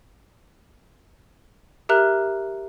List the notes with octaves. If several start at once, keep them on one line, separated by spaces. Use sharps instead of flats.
G4 A#4 E5 A#5 F6 F#6